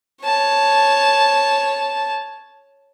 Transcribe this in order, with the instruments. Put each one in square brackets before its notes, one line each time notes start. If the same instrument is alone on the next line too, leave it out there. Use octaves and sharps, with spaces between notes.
[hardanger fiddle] C#5 A5